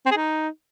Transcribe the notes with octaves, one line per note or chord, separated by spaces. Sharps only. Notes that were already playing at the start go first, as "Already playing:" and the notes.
C4
G#4
D#4